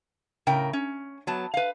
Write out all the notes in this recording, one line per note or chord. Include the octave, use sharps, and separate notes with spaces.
A2 C#3 A#4 G5
C#4
F#3 B3 A5
B4 F5